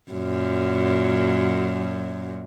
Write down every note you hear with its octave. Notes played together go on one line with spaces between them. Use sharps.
F#2 A#2 F#3